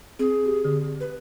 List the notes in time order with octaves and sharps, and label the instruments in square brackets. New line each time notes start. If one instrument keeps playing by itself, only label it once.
[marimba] C4 [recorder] G#4
[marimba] G4
D3
[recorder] B4